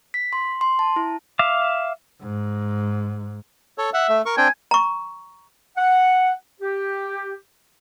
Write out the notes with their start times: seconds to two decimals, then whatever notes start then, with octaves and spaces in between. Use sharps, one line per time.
0.14 B6
0.33 C6
0.61 C6
0.79 A5
0.96 E4
1.39 E5 F5 D6
2.21 G#2
3.78 A4 C#5
3.94 E5 F#5
4.09 A3
4.26 A#4 C#6
4.37 C4 D4 G5 G#5
4.71 A#5 C#6
5.78 F#5
6.61 G4